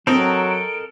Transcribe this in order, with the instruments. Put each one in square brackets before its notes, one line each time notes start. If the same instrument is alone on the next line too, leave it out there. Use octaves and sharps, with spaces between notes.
[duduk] F#3 [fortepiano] C4 [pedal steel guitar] A4 A#4 D#5 [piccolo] D7